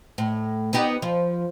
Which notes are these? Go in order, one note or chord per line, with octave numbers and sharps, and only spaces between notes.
A2
B3 D#4 G4
F3